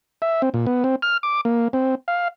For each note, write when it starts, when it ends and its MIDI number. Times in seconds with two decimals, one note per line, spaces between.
0.22 0.42 76
0.42 0.49 60
0.54 0.66 46
0.67 0.84 59
0.84 0.96 60
1.02 1.17 89
1.23 1.41 86
1.45 1.68 58
1.73 1.95 60
2.08 2.28 77